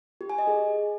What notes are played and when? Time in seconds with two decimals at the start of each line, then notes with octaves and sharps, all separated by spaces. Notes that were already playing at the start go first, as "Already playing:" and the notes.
0.21 G4
0.30 G#5
0.38 D#5
0.47 G#4